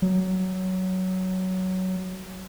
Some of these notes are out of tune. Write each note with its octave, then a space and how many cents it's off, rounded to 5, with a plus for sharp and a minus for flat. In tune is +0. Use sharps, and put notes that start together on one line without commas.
F#3 +10